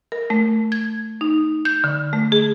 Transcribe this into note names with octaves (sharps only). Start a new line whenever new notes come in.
A#4
A3
G#6
D#4
G6
D3
A3
G#4